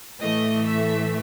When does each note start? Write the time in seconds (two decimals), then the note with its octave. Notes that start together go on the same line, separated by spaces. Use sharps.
0.20 A2 E3 A3 D#5
0.67 E5